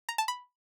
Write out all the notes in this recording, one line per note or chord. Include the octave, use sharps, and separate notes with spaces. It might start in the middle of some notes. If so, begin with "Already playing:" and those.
A#5
A5
B5